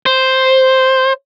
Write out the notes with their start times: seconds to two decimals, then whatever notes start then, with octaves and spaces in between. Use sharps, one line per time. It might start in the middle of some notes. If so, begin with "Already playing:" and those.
0.06 C5